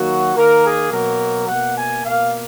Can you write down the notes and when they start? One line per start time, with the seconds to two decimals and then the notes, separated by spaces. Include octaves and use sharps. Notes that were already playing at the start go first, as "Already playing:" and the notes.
Already playing: D#3 F#3 A#3 F#4
0.36 D#3 A#3 A#4
0.64 G#4
0.92 B2 F#3 A#3 A#4
1.48 B2 A#3 F#5
1.77 G#5
2.05 B2 A#3 F5